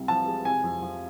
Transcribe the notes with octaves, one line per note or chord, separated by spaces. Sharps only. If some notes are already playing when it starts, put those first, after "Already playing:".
Already playing: C2 C3
F3 A5
G#3
C3 G#5
F2
F3